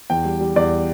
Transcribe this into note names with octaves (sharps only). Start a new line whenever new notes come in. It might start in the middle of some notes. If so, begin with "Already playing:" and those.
E2 G5
G3
G3
E2 D5